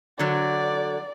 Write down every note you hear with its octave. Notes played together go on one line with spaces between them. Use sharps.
D3 F#3 D5